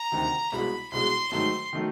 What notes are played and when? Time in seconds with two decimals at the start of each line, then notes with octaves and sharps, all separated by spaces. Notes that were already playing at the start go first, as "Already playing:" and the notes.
Already playing: A#5
0.12 D2 C3 D#3
0.52 C2 B2 G#3 B5
0.92 C2 B2 G#3 C6
1.32 G#2 D#3 F#3 A3 C6
1.73 D#3 F#3 A3